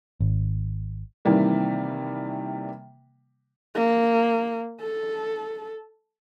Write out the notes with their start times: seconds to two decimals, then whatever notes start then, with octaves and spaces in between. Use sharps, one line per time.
0.20 G#1
1.25 C3 D#3 E3 G3 A#3
3.75 A#3
4.81 A4